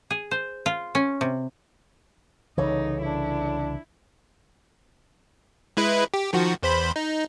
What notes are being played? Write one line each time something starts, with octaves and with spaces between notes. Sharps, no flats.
G#4
C5
F4
C#4
C3
C2 C#3 E3 D#4 A4 C#5 D5
D4 E4
G#3 E4 B4
G4
D#3 F3 F#4
E2 C5 B5
D#4